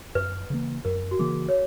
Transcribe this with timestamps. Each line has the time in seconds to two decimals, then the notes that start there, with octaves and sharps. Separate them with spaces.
0.15 F#2 B4
0.50 C#3 E3 A#3
0.85 F#2 A#4
1.11 F#4
1.19 C#3 E3 A#3 G#4
1.49 C#5